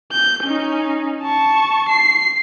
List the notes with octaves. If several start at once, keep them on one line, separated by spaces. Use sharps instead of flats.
G6
C#4 D#4
A5 C#6
C7